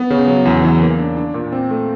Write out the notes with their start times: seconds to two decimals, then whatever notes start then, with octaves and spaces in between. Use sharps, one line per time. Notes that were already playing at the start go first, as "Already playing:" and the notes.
Already playing: B3
0.10 C#3
0.27 F#3
0.45 E2
0.63 E3
0.81 A#3
0.99 D4
1.17 D4
1.34 A#2
1.52 C4
1.71 A3